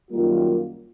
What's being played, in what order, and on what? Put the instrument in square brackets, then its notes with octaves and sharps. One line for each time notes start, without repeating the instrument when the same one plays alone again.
[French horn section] F#2 D#3 G3 A#3 F4